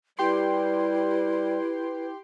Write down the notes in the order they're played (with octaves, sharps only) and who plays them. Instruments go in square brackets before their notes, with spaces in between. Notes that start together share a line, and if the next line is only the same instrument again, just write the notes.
[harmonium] G3 [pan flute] E4 [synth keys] G4 G5 C6 [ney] B4